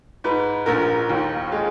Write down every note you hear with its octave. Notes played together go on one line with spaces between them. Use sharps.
G#2 B4
A#1 A#4
D#2
G#3